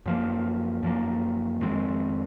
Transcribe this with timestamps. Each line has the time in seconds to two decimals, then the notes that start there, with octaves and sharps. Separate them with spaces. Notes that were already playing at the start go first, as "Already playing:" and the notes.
0.06 F#2 F3 A#3
0.83 F#2 F3 A#3
1.61 F2 D#3 G#3 C4